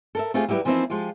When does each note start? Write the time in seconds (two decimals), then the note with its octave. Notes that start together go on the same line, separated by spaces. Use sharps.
0.15 A4 A#4 E5
0.34 A3 C4 F4 G4 G#4
0.48 F#3 G3 E4 G4 B4
0.65 E3 F3 A#3 C4 D#4 E4
0.90 F3 G#3 F4 G4